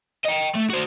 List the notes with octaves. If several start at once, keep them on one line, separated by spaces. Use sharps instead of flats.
D#5 G5
A3
F#4 C5